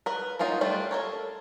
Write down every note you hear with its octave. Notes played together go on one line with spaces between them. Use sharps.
A#4 B4
F#3 A#3 D#4 F4
G3 A3 D4 F4
A4 A#4 C#5